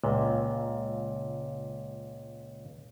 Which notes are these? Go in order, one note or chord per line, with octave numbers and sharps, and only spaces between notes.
C#2 A#2